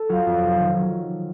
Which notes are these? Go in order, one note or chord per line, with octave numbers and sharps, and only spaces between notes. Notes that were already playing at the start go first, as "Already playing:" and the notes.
Already playing: A4
F#3 F4
F2
F1
D#3
F#3